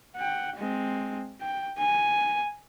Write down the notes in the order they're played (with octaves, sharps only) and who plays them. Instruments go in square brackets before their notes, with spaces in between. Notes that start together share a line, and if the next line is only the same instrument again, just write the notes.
[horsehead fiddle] F#5 G5
G#3 C4
G5
G#5